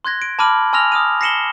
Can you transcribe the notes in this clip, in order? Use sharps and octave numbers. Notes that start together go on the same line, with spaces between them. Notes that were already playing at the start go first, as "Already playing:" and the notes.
C6 F#6 G#6 A#6
D7
A5 B5 D6 F6 D#7 F#7
G#5 C6 E6 F6 A#6 F7
D#6 F6 D#7
A#6 C7 C#7 E7 F#7 G7